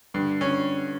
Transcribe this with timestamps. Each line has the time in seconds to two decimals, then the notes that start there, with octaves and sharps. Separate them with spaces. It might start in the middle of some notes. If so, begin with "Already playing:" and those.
0.14 G2 D3
0.41 D3 C#4